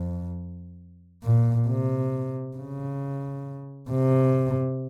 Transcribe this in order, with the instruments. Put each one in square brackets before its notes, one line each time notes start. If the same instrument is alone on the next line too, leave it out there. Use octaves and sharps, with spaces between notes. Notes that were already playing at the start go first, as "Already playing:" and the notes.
Already playing: [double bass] F2
A#2
C3
C#3
C3